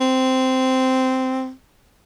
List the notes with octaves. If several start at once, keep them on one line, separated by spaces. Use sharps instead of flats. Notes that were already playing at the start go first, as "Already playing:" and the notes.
C4